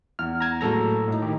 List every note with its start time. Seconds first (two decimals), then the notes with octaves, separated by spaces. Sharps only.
0.19 E2 F6
0.40 A#5 G#6
0.61 A2 F#3 G#3 A#3 A4 A#5
1.08 A2 D#4
1.22 D#3 G4